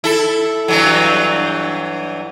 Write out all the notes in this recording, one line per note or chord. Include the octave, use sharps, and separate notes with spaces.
E4 A4
G2 E3 F#3